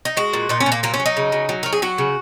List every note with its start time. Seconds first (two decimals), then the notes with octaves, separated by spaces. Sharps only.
0.05 D#4
0.17 G#3 F#4
0.33 A#2
0.49 A#2 D#4
0.60 C#4
0.66 A#2
0.72 A#3
0.83 F#3 A#3
0.94 C#4
1.00 F#3
1.06 D#4
1.17 C#3
1.32 F#3
1.49 F#3
1.63 F#3 A#4
1.73 G#4
1.82 F#3 F#4
1.98 C#3